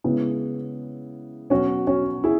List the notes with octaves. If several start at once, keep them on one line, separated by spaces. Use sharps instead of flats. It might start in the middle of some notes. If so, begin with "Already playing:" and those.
C#3 G#3 B3 E4
B2 F#3 C#4 F#4
C#4 F#4
E4 G#4